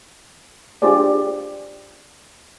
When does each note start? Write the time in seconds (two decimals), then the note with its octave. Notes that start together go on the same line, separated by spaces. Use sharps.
0.82 D4 F4 G4 G#4 C5 D5